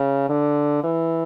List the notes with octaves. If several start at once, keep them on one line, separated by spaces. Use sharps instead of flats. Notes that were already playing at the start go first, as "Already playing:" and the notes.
Already playing: C#3
D3
E3